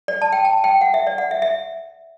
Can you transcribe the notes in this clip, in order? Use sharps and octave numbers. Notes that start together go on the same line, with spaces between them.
D5
A5
G5
A5
G5
F#5
E5
D5
F#5
E5
E5